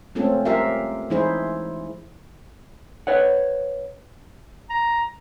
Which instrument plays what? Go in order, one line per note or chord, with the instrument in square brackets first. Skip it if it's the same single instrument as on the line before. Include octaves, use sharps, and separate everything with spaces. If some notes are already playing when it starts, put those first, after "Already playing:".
[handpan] G#3 A3 C4 C#4 F4 A4
F4 G4 A#4 E5 F5
E3 G#3 D#4 E4 G#4 C5
[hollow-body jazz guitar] B4 C#5 F#5
[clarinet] A#5